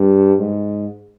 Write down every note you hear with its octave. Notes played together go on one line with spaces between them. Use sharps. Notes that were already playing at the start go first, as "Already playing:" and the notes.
Already playing: G2
G#2